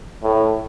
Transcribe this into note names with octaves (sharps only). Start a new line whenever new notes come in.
A2